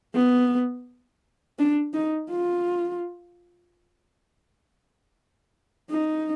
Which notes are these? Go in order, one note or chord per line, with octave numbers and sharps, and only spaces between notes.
B3
D4
D#4
F4
D#4